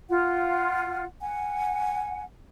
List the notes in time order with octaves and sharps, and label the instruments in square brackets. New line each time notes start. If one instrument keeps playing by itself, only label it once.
[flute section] F4 [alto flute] F#5
[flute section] F#5 [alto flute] G#5